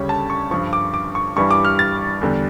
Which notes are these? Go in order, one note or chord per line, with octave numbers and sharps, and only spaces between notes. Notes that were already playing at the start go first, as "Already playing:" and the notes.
Already playing: D2 C#3 G3 C#5
A5
C#6
G2 F3 C#6
D6
D6
C#6
G2 E3 G3 C#6
D6
F6
A6
E2 D3 G3